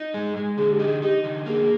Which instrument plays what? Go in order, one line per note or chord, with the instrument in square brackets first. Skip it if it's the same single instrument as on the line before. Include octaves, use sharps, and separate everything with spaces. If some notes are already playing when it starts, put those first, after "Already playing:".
Already playing: [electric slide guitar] D#4
G#3
G#3
[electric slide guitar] D3 [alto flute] G#4
[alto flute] G4
[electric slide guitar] D#4
[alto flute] G#4
[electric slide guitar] D#4 [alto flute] G4
[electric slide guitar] D3
[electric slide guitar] A#3 [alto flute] G#4